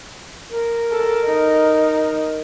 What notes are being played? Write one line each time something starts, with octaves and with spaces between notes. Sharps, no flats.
A#4
A4
D#4